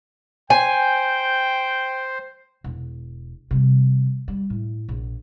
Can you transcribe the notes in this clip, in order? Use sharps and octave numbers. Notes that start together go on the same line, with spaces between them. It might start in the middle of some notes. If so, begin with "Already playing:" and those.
C5 G5 G#5
E1
C3 G3
G3
A2
A#1